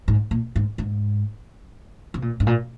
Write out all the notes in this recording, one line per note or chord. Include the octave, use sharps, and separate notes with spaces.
G#2
A#2
G#2
G#2
C3
A#2
G#2
A#2